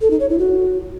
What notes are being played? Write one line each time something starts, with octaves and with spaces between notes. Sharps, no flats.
A4
D#4
C#5
E4
F#4